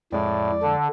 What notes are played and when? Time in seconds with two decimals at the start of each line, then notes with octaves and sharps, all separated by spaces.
0.12 F2 A2 G#3 D5
0.62 D3 A4